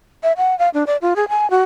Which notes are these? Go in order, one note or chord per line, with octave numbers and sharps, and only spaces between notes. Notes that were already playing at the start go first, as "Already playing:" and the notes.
E5
F#5
F5
D4
D5
F4
G#4
G#5
F#4